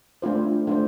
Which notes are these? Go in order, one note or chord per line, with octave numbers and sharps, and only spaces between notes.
A3 D4 F4 C5
A3 D4 F4 C5